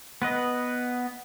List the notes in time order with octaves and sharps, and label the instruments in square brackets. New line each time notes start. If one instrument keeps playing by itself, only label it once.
[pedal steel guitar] B3 B4 D#5